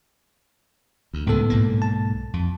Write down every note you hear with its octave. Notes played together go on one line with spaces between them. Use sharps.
D2
C#2 A2 D#3 B3 A4
B1 G#2 A#3
A5
F2